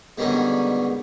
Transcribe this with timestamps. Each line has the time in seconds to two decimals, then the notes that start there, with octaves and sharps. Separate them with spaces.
0.18 G#2 B2 D3 D#3 G3 C#4